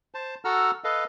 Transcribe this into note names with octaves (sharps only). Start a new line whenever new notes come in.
C5 A5
F#4 A4 F#5 A#5 E6 F6
A4 B4 D#5 F5